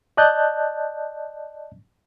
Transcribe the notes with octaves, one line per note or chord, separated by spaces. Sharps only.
D5 D#5 A5 F#6 G6